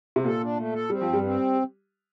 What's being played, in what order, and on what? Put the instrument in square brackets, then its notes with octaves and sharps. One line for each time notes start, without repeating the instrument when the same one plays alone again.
[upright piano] C3
[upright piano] A#2 [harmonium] A4
[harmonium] D4
A3
A4
[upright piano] G3 [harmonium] C4
[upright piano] F3
[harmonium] G2
[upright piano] G3
[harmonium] C4